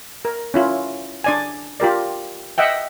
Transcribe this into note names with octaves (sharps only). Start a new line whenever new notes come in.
A#4
C#4 E4 F4
D4 D5 G#5
F4 G4 A#4 D5
D#5 E5 F#5 G5